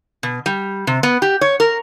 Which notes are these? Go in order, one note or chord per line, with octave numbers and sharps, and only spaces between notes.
B2
G3
C3
B3
G4
C#5
A#4